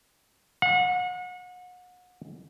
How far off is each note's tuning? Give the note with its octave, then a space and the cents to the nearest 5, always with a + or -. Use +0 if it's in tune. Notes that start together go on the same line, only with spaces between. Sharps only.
F#5 -35